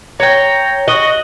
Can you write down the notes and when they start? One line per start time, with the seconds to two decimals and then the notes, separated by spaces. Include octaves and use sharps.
0.20 C#5 G5 A#5
0.88 F#4 D#5